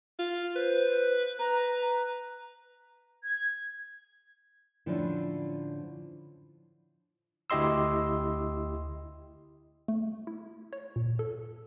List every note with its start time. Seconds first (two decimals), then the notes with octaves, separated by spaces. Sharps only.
0.19 F4
0.56 B4 C5
1.39 B4 A#5
3.24 G#6
4.86 A2 D3 F3 C#4 E4 F4
7.50 D2 E4 G4 D#5 C6 E6
9.88 A3
10.27 E4
10.73 C#5
10.96 A#2
11.19 A4